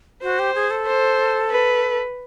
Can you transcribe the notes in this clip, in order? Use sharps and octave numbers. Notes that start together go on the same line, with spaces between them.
F#4 C5
G4
G#4
A4
C5
B4